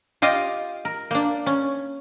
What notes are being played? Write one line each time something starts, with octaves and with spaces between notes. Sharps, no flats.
F4 G4 D#5 F5
A#4
A#3 D4
C#4